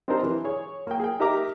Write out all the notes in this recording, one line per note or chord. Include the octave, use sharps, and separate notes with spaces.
C4 D4 D#4 G4 A#4 C5
E3
G#4 C#5
A#3 G5
G#4 G5
D#4 G4 A#4 E5 A#5 D6